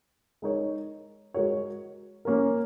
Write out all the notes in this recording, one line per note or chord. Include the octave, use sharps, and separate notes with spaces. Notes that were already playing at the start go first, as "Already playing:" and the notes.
G#3 D#4 A#4 C#5
G#3 F#4 A#4 C#5
A#3 C#4 A#4